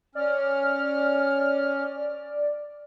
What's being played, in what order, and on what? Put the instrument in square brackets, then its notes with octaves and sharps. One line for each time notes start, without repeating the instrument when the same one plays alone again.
[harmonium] C#4 [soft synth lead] D5 [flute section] F6